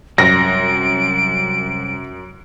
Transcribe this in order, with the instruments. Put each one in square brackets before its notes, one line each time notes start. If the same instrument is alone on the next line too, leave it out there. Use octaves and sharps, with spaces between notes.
[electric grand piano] F#2 [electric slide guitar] C3 G3 [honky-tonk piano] A#6 [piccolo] D7